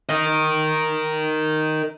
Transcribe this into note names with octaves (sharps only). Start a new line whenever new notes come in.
A#4 D#5